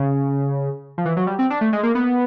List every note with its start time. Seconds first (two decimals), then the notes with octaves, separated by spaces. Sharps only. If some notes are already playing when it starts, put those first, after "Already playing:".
Already playing: C#3
0.98 F3
1.05 E3
1.17 F#3
1.27 G3
1.39 C4
1.50 D4
1.61 A3
1.73 G#3
1.83 A#3
1.95 B3